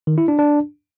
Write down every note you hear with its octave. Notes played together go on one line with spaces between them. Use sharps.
D#3
E4
D4
D4